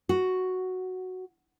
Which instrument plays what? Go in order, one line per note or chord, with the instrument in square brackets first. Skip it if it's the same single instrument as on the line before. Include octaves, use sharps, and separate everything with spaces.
[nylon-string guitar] F#4